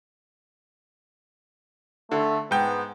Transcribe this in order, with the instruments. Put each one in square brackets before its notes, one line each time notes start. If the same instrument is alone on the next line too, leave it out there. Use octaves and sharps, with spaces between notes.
[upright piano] D3 [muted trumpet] A3
[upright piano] G#2 G5 [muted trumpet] B3